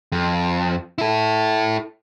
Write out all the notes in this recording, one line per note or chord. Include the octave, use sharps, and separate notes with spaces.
F2
E4 A4